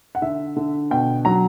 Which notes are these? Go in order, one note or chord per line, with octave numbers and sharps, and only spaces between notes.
F#5
D3 E5
D3
B2 G5
F#3 A#5